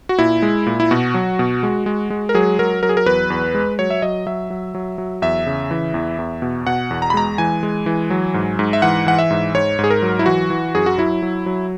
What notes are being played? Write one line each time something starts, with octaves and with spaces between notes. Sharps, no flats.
F#4
A#2 E4
G#3
A#2
E4
B2 F#4
F#3
B2
G#3
G#3
G#3
A#4
F#3 G#4
F#3 A#4
F#3 A#4
G#4
A#4
E2 B4
E2
G#3
F#3 C#5
E5
F#3 D#5
F#3 E5
F#3
F#3
F#3
E2 E5
C#3
E3
E2
E2
B2
B2 F#5
E2
A#5
B5
G#3 A#5
E3 G#5
G#3
E3
F#3
G#2
G#2
E5
E3 F#5
E3 F#5
E5
G#2
G#2 C#5
G#2
G#4
A#4
F#3
E4
E3 F#4
E3
F#2 G#4
F#4
F#3 E4
F#3
F#3